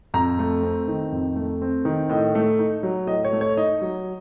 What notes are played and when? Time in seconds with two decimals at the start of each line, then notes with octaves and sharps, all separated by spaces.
0.14 F2 A#5
0.39 A3
0.63 C4
0.88 D#3
1.12 F2
1.36 A3
1.62 C4
1.85 D#3
2.10 A2 D#5
2.35 A3
2.59 D#4
2.83 F#3
3.07 A2 D#5
3.25 C#5
3.32 A3
3.41 C#5
3.57 D#4 D#5
3.82 F#3